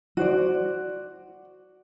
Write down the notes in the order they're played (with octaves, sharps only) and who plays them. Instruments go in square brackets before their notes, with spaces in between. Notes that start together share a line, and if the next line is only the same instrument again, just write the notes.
[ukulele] F#4 C5 D5